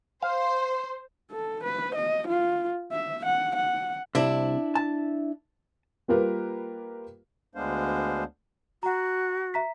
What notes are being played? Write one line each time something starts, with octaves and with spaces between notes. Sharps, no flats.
C5 F5 C6
A4
B4
D#5
F4
E5
F#5
F#5
C2 C3 D4 E4 E5
A5
G3 A#3 F4 G4 A#4 B4
D2 G#3 B3 D4 C5 F5
F#4 F#5 A#5
E5 A#5 B6